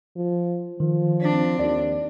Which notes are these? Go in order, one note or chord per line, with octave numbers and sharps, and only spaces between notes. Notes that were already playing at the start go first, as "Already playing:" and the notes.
F3
D#3 F3
C4 D4
D#2 D5